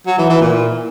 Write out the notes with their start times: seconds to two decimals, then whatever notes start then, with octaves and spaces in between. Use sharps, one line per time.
0.06 F#3
0.18 E3
0.29 E3
0.41 A#2